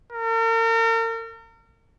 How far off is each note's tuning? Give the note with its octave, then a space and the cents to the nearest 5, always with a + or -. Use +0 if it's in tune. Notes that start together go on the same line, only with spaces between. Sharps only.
A#4 -40